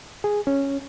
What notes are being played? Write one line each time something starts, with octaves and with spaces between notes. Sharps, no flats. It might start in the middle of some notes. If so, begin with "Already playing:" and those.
G#4
C#4